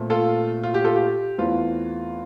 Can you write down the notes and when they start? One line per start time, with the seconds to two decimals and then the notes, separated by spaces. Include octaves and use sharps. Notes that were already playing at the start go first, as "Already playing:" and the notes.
Already playing: A#2 A3 C4
0.10 F4 A4
0.64 F4
0.74 G4
0.84 F4 A4
0.96 G4
1.38 E2 E3 A3 C4 F4